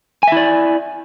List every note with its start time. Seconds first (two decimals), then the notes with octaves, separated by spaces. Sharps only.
0.23 G#5
0.28 E5
0.32 E4
0.37 D5